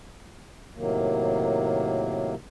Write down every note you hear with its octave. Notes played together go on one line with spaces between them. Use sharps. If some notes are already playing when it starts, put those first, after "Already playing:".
A2 C3 D#3 F#3 A#3